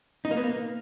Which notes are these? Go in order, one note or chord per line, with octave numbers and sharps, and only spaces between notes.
D#4
A#3
B3
A#3